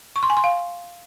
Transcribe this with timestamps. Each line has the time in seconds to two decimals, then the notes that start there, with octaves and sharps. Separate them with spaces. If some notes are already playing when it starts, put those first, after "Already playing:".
0.16 C#6
0.23 C6
0.30 G#5
0.37 C6
0.44 F5